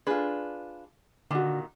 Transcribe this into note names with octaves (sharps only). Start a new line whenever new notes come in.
D4 F4 G#4 B4
A#2 D3 D#3 D4 F#4